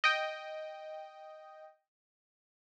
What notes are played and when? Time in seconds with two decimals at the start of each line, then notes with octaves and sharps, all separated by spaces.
0.04 D#5 G5